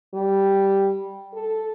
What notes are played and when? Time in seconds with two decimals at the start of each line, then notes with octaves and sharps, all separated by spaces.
0.14 G3
1.33 A4